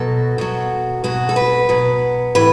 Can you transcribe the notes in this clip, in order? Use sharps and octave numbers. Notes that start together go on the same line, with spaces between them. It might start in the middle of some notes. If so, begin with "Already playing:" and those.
Already playing: B2 F#3 A4
B2 F#3
B2 F#3 F#4
A4
B4
B2 F#3
A2 E3 B4